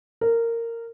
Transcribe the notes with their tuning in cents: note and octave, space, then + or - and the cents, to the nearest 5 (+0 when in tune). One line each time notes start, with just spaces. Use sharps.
A#4 -15